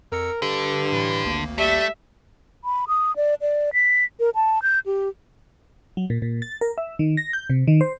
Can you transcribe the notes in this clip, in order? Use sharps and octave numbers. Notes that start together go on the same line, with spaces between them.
F2 A#4 E6 C#7
G2 D3 A4
A2 E3 B5
G#1 D2 A#3
G3 A3 E5
B5
D#6
D5
D5
B6
A#4
A5
G6
G4
F#3
A#2
A#2
A6
A#4
E5
D#3
A#6
G6
C3
D#3
C5